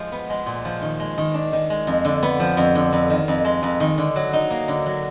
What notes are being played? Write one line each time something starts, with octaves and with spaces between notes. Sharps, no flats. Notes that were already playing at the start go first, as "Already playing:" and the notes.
Already playing: F3 G#3
B3
G#3
A#2
F3
D#3
G#3
D#3
D4
D#3
G#3
F2
D3
B3
F3
F2
D3
F2
D#3
F2
G#3
F2
D#3
D3
F#3
D#4
A#3
D3
F#3